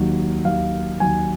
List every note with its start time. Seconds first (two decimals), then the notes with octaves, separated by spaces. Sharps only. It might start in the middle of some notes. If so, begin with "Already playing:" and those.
Already playing: D#2 D#3 F#3
0.45 D#2 D#3 F#3 F5
1.00 D#2 D#3 F#3 G#5